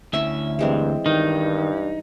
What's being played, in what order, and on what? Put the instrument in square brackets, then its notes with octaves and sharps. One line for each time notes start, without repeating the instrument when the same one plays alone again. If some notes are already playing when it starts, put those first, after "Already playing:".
[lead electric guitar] D2 E5 [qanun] C#4 E4
[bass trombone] G2 [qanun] E3 G#3 C4
[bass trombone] G2 [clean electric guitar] D#3 [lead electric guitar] D#4